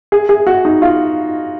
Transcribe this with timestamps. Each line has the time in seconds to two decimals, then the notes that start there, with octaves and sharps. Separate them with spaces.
0.12 G#4
0.29 G#4
0.47 F#4
0.65 D#4
0.82 F4